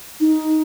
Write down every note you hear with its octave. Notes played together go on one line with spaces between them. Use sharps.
D#4